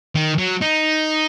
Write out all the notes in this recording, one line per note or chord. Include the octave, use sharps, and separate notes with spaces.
D#3
F#3
D#4